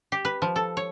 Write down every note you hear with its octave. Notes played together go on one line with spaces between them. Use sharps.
G4
B4
F3
A4
C#5